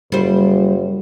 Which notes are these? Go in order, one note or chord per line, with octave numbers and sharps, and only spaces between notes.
F#1 G3 C5